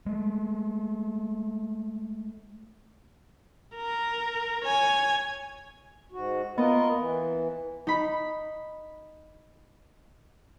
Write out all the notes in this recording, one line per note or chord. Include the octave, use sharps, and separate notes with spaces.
G#3 A3
A#4
C#5 G#5
G#2 F#4
B3 F4 A#4 D#5
E3
D#4 B5